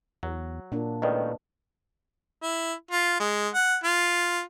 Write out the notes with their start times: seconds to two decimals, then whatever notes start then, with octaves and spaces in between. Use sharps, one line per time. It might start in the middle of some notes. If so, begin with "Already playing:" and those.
0.23 E2 F#3
0.72 A#2 A#3 D4
1.02 C#2 A2 D#3 B4 D5 D#5
2.43 E4
2.91 F4
3.20 G#3
3.54 F#5
3.84 F4